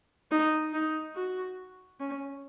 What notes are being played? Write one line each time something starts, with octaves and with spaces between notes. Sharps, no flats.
D#4
D#4
F#4
C#4